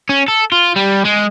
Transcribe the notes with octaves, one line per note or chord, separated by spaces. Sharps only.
C#4
A4
F4
G3
G#3